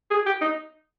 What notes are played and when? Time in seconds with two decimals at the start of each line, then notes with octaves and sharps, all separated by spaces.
0.11 G#4
0.26 G4
0.41 D#4